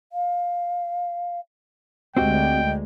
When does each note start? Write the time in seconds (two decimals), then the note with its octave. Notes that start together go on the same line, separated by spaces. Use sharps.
0.13 F5
2.17 D2 G#3 C4 F#4 G4 D#5 G5